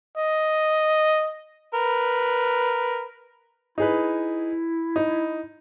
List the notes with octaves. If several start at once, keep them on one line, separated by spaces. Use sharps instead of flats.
D#5
A#4 B4
D#4 E4 G#4 B4
D#4